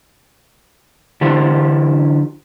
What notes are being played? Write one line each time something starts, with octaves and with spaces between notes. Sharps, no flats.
D3 E3 D4 F4 G4 C5